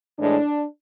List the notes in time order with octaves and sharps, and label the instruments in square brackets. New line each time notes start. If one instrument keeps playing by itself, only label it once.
[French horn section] A2 E3 G#3 D4